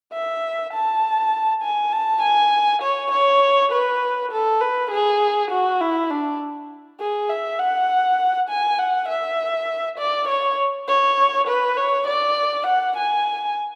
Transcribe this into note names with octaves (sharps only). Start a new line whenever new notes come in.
E5
A5
G#5
A5
G#5
C#5
C#5
B4
A4
B4
G#4
F#4
E4
D4
G#4
E5
F#5
G#5
F#5
E5
D5
C#5
C#5
B4
C#5
D5
F#5
G#5